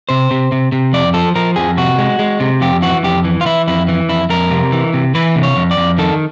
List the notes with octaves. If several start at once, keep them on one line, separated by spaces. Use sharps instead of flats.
C3 C5
C3
C3
C3
F2 D5
F3 A4
F3 A#4
F2 G#4
C3 F#4
G#3
G#3
C3
F2 G4
E3 F#4
F2 G4
E3
F4
E3 E4
F2 E4
E3
F2 E4
F2 A#4
C3
E3
C3
E3 B4
C3
C#5
F2
D5
F2
D#3 A4